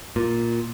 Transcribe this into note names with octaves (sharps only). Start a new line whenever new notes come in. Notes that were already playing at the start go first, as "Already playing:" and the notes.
A#2